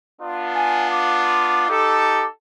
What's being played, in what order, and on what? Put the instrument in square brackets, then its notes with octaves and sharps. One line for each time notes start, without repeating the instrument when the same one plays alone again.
[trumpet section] B3 D4 F4
[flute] G#5
D6
[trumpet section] D#4 G4 A4